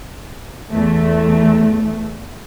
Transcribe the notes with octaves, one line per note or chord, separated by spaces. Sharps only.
E2 A3